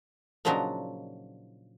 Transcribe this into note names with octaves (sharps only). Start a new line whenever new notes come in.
A#2 C#3 F3 F#3 D4 D#4